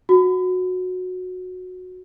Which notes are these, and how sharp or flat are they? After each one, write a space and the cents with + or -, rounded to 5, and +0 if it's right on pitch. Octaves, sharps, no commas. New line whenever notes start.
F#4 -15